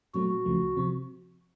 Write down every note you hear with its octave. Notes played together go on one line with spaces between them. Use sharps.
A#2 F#3 A3 C4 F#4
C#2 C#3 F3 A3
C3 F3 C4